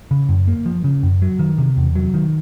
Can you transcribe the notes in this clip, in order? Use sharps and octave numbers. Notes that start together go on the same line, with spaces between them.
C#3
F#2
A#3
F3
C#3
F#2
F#3
D#3
C3
E2
F#3
D#3